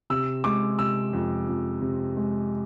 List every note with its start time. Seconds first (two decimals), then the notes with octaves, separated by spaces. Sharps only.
0.10 C3 E6
0.44 G#3 D6
0.79 C3 E6
1.13 F2
1.48 F2
1.82 C3
2.17 G#3